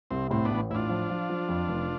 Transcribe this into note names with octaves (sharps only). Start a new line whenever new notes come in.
C2 C4
A2 C4
B3 D4
A1
A2 D4 E4 F4
F3
F3
F3
F2
F1